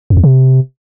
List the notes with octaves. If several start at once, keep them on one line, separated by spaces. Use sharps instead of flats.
F2
E2
C3